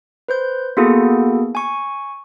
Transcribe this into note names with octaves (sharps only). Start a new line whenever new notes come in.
B4 C5 G6
A#3 B3 E4 F#4 G#4 A4
G#5 C#6